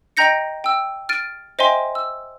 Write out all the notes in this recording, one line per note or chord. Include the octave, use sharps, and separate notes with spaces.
D#5 G5 A#5 G6 A#6 C#7
G5 E6
F6 A6 D7 D#7
C5 D#5 E5 G5 G#5 C6
E6